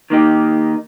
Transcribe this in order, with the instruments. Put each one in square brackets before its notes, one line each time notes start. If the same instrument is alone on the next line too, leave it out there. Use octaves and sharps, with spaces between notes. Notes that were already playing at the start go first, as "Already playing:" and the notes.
[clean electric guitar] D#3 A#3 D#4 G4